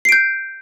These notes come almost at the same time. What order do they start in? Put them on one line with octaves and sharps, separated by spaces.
C7 D7 G6